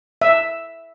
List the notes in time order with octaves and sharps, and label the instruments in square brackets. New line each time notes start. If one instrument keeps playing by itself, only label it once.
[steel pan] E5